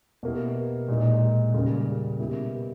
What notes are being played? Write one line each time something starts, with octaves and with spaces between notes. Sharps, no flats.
B2 A#3 E4 G4
A#2 G#3 D#4
C#3 G3 A#3
B2 A#3 E4 G4